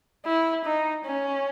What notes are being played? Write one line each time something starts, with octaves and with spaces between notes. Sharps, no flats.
E4
D#4
C#4